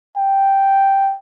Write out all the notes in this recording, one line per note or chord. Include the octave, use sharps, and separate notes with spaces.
G5